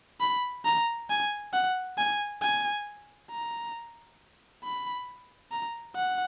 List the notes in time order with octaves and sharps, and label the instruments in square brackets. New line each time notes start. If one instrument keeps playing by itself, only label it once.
[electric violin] B5
A#5
G#5
F#5
G#5
G#5
A#5
B5
A#5
F#5